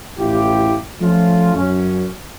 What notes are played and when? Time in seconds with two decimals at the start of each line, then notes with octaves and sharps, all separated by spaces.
0.18 A1 E4 F4 G4
1.00 F3 A3 C#4 F4
1.55 F#2 C#4